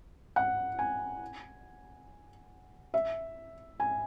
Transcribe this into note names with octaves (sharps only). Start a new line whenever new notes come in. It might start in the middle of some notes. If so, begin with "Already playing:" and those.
F#5
G#5
E5
G#5